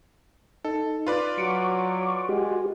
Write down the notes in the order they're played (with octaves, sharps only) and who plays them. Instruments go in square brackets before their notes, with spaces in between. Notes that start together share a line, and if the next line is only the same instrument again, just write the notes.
[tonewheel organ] D#4 [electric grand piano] A4
[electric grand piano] F4 B4 D5
[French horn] F#3 [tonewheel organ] C#6 D6
[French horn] G#3 [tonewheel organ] F#4 G4